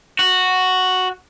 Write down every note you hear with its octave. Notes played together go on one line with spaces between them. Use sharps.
F#4